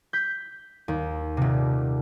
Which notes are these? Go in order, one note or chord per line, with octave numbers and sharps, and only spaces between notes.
G6 B6
D#2
D#1 C3